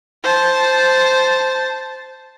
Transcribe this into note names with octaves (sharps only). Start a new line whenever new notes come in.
C5 A5